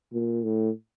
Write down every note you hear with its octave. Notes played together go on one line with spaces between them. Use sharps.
A#2
A2